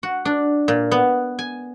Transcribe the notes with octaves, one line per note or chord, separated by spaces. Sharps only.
F#4
D4
A#2
B3
G#5